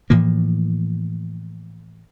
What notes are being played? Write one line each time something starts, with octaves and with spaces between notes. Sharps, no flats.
A2 E3 F3 A#3